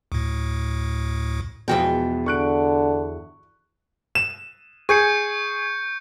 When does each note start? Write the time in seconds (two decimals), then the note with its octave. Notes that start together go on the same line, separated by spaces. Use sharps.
0.12 D2 A2
1.68 E2 B2 F3 G#3 F#4 G5
2.26 D3 C#6 F#6 D7
4.15 E7
4.89 G#4 C#6 G6 C#7